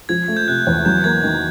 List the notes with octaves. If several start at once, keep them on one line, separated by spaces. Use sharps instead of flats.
F3 G#6
A3
G6
C3 F#6
E2
F#3 G6
A#3 G#6
D#3